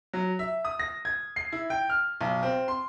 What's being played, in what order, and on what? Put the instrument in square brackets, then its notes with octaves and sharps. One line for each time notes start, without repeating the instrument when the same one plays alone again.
[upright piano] F#3
E5
D#6
A#6
G#6
C7
E4
G5
F6
B1
C4
C6